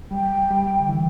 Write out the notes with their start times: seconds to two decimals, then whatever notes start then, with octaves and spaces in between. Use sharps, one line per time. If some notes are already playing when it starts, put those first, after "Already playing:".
0.11 G3 G5
0.50 G3
0.80 D3
0.89 E3